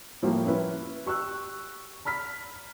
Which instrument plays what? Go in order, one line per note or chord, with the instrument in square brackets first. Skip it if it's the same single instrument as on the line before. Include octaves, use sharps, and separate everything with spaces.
[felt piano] A2 F3 G3 A#3
C#4 E4 B4
G4 C#6 E6 F#6
A#5 B5 F6 B6